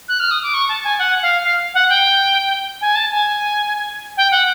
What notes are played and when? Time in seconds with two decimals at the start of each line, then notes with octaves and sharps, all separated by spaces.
0.08 F#6
0.20 F6
0.31 D#6
0.43 D6
0.54 C#6
0.68 A5
0.84 G#5
0.99 F#5
1.22 F5
1.44 F5
1.74 F#5
1.90 G5
2.81 G#5
2.95 A5
3.11 G#5
4.17 G5
4.31 F#5